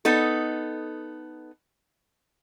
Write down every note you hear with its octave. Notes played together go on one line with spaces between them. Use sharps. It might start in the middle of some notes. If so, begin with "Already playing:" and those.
B3 D#4 A4